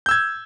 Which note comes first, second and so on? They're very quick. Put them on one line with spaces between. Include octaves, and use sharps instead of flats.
G6 E6 G#6